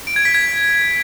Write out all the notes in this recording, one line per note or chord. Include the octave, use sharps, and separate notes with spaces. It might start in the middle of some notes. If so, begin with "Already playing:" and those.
D7
G#6
B6
G#6